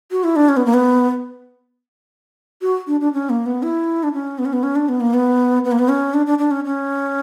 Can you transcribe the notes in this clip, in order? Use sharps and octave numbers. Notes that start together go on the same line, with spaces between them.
F#4
E4
D4
C#4
B3
A#3
B3
F#4
D4
D4
C#4
A#3
B3
E4
D4
C#4
B3
C#4
B3
C#4
D4
B3
A#3
B3
B3
A#3
B3
C#4
D4
D4
D4
C#4
C#4